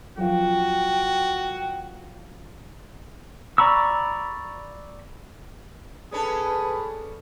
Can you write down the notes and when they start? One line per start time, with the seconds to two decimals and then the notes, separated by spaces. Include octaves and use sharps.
0.18 F#2 F3 F#4 G5
3.58 D5 A#5 B5 C#6 E6
6.12 C#4 D4 G#4 A4 B4